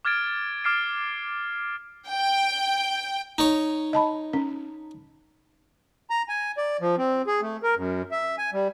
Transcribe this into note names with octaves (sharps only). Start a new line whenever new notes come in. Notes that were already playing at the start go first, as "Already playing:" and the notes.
D6 F6 G#6 A6 D7
D6 F6 C7 D7
G5
D#4 C#5
D#5 A5 B5
C#4
A#5
G#5
D5
F3
C4
G#4
A3
A#4
F#2
E5
G#5
G3